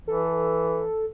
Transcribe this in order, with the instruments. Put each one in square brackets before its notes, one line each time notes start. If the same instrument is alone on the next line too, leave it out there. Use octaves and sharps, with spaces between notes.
[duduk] E3 [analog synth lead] A4